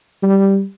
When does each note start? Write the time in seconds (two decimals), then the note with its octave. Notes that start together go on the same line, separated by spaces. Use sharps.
0.23 G3